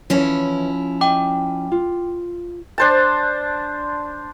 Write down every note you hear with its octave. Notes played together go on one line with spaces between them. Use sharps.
E3 F3 C#4 E4 B4 C#5
D#5 G5 D6
F4
D4 C5 A5